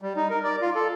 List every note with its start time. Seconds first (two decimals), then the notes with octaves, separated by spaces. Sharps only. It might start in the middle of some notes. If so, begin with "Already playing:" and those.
0.02 G3
0.16 D#4
0.30 A#4
0.44 D5
0.62 F4
0.75 A4